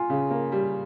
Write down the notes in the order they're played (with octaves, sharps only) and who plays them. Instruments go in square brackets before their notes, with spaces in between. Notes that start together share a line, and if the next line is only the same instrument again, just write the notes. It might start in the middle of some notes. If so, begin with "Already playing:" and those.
Already playing: [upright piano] F4 [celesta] G#5 C6
[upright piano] C#3
A#3
G3